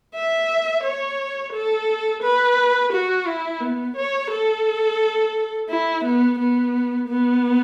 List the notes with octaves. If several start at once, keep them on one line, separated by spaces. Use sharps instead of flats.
E5
C#5
A4
B4
F#4
E4
B3
C#5
A4
E4
B3
B3
B3